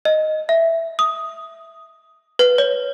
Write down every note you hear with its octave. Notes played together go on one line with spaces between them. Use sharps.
D#5
E5
D#6
B4
C#5